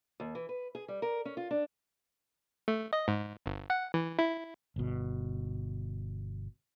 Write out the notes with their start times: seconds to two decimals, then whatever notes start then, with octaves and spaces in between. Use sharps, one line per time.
0.20 D#2
0.35 E3
0.49 B4
0.75 G#4
0.88 G3
1.02 A#4
1.25 C#4
1.37 F4
1.51 D4
2.68 A3
2.93 D#5
3.08 G#2
3.46 G1
3.70 F#5
3.94 E3
4.19 E4
4.76 G1 B2